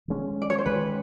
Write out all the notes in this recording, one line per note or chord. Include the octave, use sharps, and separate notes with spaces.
D#3 G#3 C#4
D5
C#5
C5
D#3 G#3 C#4 B4